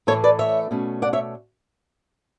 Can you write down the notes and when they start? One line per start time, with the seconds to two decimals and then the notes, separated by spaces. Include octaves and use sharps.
0.07 A2 E3 A3 A4 C#5
0.24 B4 D5
0.39 C#5 E5
0.71 B2 A3 C#4
1.02 D5 F#5
1.13 C#5 E5